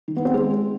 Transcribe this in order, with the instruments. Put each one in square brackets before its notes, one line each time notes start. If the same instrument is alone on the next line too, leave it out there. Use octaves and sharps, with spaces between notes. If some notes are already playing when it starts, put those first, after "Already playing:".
[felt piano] D#3
B3
C4
G#3